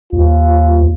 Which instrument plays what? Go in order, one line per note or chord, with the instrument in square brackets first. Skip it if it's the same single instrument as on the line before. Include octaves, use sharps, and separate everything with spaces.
[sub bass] D#2 [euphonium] F4